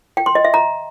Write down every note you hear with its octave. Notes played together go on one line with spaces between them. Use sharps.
G5
C6
D#5
E5
A#5